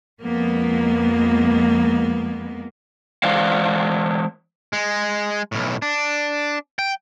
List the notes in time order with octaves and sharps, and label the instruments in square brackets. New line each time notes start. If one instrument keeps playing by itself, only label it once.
[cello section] F2 G#3 A#3 B3
[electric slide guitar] E3 G#3 C5 D5 F5
[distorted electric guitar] G#3
B1 A2
D4
G5